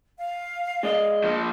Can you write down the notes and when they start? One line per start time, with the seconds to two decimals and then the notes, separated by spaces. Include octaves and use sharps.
0.18 F5
0.83 G#3 D5 D#5
1.24 F3 A#3